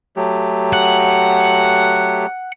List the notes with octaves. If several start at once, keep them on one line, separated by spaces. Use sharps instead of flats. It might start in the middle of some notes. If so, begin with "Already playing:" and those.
F#3 A3 G4
F#5